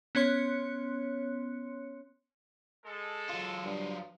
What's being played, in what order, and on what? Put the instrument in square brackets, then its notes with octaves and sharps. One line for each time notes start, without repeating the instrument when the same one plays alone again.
[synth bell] B3 C#4 C#5 C6 F#6 C#7
[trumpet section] G#3 A4
[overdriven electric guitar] F#3 F4
[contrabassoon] G2